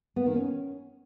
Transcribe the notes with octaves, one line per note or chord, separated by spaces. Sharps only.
B3
D#3
C#4